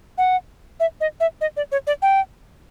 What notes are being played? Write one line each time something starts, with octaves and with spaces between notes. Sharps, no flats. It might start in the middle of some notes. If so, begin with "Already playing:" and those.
F#5
E5
D#5
E5
D#5
D5
C#5
D5
G5